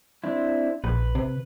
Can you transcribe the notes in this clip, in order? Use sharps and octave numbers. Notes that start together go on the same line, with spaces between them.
C4 D4 E4
A#1 B4
C3